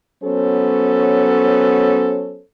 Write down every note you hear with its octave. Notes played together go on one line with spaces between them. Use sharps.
F#3 B3 C#4 A4 C5 C#5